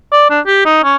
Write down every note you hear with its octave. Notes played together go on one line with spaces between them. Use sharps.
D5
D4
G4
D#4
C#4